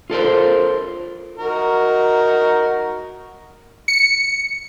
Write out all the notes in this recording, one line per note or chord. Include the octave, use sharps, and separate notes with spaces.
F4 A4 A#4 C5
D#4 F#4 A#4
C#7